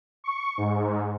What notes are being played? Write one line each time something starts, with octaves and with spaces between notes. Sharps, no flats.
C#6
G#2